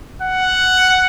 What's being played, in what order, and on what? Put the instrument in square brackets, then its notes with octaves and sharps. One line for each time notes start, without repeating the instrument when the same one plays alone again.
[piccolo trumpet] F#5